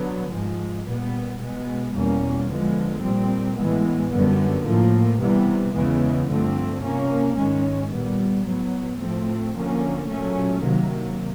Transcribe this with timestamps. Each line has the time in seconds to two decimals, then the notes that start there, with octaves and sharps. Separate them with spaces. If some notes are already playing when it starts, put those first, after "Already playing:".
Already playing: D3 F#3 B3
0.30 G#2 F3 G#3
0.85 A#2 G3 B3
1.39 B2 G#3 B3
1.94 E2 B2 G3 A#3 C#4
2.48 D3 F3 G#3 B3
3.02 A#2 G3 C4
3.57 A2 E3 G#3 B3
4.11 F#2 D3 G3 B3
4.65 A2 F3 A#3
5.19 C3 E3 G3 B3
5.74 E2 C#3 E3 G#3 B3
6.29 G2 D3 F3 A3 C4
6.83 C3 F3 A#3 C#4
7.37 G#2 D#3 G#3 C#4
7.92 A#2 G3 B3
8.45 A2 F#3 B3
9.00 A2 F3 A3 C4
9.54 D3 F3 A#3 C#4
10.09 A#2 F#3 A3 C#4
10.63 C3 D#3 F#3 A#3